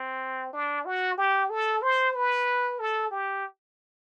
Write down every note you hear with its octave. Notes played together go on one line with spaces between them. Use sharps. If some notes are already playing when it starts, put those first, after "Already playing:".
Already playing: C4
D4
F#4
G4
A4
C5
B4
A4
G4